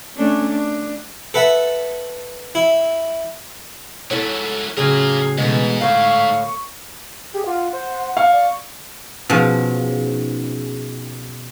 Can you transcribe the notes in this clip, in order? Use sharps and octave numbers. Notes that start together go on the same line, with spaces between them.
A3 C#4 D4
D4
A4 B4 E5 F#5
E4
G#2 F#3 E4 A4 C#5
A2 C#3 F#3 F4 G#4 A#4
G#2 B2 E3 G#3 A3
A2 D3 F5 C#6
G4 G#4
F4 F#5
C5
F5 C#6
D5
B2 F3 C#4 D#4 G#4